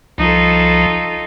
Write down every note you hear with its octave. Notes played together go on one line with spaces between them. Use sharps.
C2 F3 D#4 F4 A4